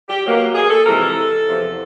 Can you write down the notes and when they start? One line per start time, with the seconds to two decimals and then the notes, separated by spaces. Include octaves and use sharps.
0.09 G4
0.24 B2 F#3 A#3
0.55 G#4
0.70 A4
0.85 F2 C3 E3 G#3 A#4
1.01 A4
1.48 E2 C3 F3